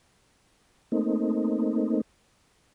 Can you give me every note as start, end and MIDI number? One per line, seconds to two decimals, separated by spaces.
0.92 2.01 57
0.92 2.01 58
0.92 2.01 60
0.92 2.01 63